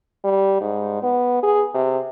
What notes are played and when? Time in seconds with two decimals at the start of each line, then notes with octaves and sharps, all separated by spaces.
0.24 G3
0.61 G#2
1.03 B3
1.43 G#4
1.74 C3